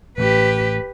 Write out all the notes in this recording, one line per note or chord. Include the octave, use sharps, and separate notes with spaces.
A1 A2 G4 B4